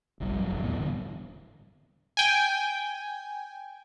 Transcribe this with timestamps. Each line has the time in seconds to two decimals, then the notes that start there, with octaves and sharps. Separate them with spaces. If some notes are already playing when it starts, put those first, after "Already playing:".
0.20 F#1 B1 F#2 G3
0.35 G#1 D#3 F#3
0.51 F#1 C2 F2
0.63 E1 A2 B3 C4
0.77 G2 D3 E3
2.17 G5 G#5